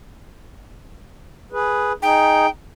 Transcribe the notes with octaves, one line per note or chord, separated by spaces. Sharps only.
G#4 B4
D#4 G#4 G5